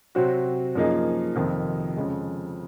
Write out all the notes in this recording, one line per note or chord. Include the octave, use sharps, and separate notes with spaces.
C3 F#3 C4 F#4
F#2 F3 A#3 D#4 G#4
F2 C3 D#3
F2 C#3 G#3